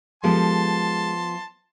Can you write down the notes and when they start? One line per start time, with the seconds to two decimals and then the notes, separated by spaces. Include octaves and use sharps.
0.24 F3 G#3 B3 G4 A4 A5 C6